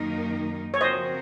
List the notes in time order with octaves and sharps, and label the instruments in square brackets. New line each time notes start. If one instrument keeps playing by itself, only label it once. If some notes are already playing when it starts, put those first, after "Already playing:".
Already playing: [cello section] F#2 D#3 A#3 D#4 A#4
[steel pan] C#5
[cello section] C#3 F3 C4 F#4 A#4 [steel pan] C5 D#5